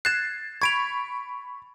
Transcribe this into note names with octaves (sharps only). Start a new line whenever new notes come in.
F#6 G#6 A6 C7 E7
B5 C#6 G#6 D7 F7